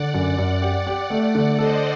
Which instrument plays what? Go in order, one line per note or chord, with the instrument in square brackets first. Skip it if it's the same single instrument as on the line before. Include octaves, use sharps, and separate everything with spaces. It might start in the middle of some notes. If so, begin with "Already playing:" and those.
Already playing: [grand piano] D3 [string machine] D5 F#5
[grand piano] F#2
F#2
G4
G4
[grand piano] A3 [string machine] D5 F#5
[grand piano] D3
[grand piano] A4 [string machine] C5 D#5